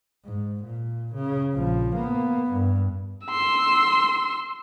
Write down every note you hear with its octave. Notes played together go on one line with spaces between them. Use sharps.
G#2
A#2
C#3
A#1 F3
A#3 B3
G2
C6 E6